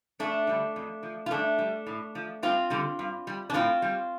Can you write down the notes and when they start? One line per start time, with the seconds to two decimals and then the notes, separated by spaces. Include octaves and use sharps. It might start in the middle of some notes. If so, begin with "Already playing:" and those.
0.19 F2 A3 D4
0.47 D3 G3
0.76 F2
1.03 F3
1.26 F4
1.31 G2 A3 D4
1.59 G3
1.87 A2
2.15 F3
2.43 G2 C4 F4
2.70 D3 G3
2.99 G2
3.27 G3
3.50 D4
3.54 A2 C4 F4
3.82 G3